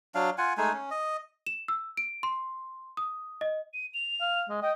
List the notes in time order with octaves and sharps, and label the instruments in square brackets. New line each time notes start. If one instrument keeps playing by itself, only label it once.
[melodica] F#3 D4 F5
F4 F#5 G#5
G#3 A3 D#4 G#5
C#4
D#5
[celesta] E7
E6
D7
C6
D#6
D#5
[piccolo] D#7
F7
[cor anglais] F5
G#3
[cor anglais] D#5 [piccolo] G5